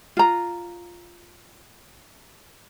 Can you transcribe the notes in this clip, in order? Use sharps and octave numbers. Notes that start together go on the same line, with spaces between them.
F4 A#5